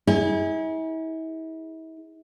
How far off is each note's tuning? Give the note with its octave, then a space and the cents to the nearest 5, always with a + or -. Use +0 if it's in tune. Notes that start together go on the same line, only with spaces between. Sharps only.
E4 -40 G#4 -15